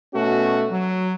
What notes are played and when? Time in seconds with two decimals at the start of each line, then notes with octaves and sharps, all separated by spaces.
0.14 B2 A3 C#4 F#4
0.71 F#3